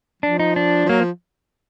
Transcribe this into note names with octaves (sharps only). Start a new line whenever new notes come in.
F3 D4
D#4
D4
F3
F#3 A#3
F3